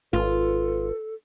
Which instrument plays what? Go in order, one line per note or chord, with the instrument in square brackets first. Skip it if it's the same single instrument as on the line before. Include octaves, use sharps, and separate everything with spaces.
[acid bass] G#1 [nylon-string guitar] F4 [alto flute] A4 [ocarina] B4